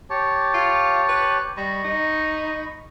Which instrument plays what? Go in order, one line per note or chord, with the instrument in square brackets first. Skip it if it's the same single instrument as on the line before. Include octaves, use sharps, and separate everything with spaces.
[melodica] G4 C#5 A5
[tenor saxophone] F4
B4
[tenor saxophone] G3 [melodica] D#5 B5 C#6
[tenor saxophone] D#4